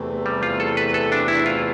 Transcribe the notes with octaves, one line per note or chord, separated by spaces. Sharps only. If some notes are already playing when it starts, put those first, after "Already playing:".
Already playing: E2 C3 E3 A3
G3
F4
A4
B4
A4
D4
E4
F4